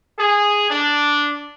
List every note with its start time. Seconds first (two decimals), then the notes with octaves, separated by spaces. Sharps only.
0.18 G#4
0.70 D4